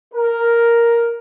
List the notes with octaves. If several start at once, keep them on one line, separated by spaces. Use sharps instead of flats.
A#4